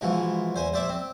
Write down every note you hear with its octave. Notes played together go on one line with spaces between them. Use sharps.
G#2 B2 E3 F3
E2 C5 G#5
A#1 C5 D5 E5 D6
C4